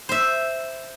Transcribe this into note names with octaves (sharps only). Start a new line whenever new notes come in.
C5 E5